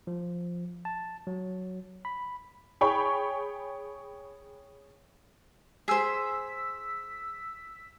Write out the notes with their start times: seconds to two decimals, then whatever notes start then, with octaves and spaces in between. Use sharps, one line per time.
0.07 F3
0.85 A5
1.27 F#3
2.05 B5
2.81 G#4 C#5 G5 B5 C#6
5.88 G#4 C5 E6 B6